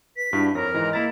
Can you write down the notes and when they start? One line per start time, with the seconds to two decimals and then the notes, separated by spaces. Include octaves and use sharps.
0.17 B4 B6
0.33 G2 D4 E4 F#4
0.55 F2 A#4 C#5 A#6
0.74 G#2 E3 D#5
0.93 A#3 E4 A#5 A6